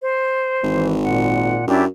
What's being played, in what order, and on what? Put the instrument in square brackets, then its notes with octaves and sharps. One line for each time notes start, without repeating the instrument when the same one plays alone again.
[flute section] C5
[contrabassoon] G#1 [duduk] E3
[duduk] A#2 [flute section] F#5
[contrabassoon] F#2 [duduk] C#4 [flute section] D4 E4 G4